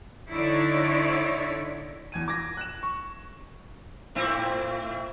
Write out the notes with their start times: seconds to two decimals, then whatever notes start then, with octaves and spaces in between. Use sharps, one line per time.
0.30 D3 D#4 E4 C#5 D5
2.12 E2 G#6 D#7
2.28 D6 G#6 A#6
2.57 F#6 A#6 E7
2.83 C#6
4.15 A2 C4 E4